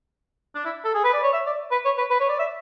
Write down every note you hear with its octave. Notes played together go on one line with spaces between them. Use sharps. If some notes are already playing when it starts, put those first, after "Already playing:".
D4
E4
A4
G#4
B4
D5
C#5
E5
D5
B4
C#5
B4
B4
C#5
D5
E5